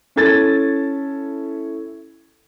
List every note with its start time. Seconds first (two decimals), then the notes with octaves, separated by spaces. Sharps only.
0.16 C#4 E4 A4 G#6 A6